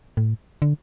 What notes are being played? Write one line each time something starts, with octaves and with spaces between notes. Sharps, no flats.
A2
D3